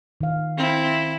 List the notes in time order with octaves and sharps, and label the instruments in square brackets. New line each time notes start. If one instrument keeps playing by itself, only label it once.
[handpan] D#3 F5
[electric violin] C4 [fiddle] E4